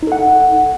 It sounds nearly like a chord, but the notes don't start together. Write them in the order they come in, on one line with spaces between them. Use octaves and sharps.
D#4 A4 F#5